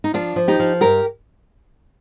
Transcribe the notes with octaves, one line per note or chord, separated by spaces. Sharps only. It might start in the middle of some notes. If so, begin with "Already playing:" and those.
D#4
F3 D4 F4
F3
D#4 G4
F3
G2 G4 A#4